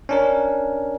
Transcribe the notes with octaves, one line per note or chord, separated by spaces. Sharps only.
C#4 D4 A#4